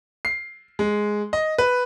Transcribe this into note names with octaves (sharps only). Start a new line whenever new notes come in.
C7
G#3
D#5
B4